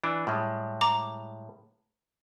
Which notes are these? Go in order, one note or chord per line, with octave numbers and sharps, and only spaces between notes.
E3 D4
A2 G3 G#3
A#5 D6